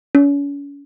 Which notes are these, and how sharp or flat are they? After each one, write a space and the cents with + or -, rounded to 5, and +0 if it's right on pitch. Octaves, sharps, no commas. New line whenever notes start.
C#4 +40